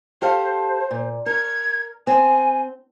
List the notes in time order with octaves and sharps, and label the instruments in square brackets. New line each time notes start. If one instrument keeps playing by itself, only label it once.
[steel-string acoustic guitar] G4 A4 F5 [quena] C5
[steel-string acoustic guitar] A#2
[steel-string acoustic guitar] A#4 [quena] G#6
[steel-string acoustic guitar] C4 [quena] G#5